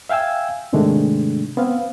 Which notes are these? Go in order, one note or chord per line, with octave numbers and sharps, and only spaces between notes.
E5 F5 G5 G#5 E6
G#2 C3 D#3 G#3 A3 D4
B3 C4 F5